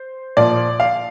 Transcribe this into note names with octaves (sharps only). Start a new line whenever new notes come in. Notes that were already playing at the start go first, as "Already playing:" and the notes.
Already playing: C5
A#2 F3 D5
F5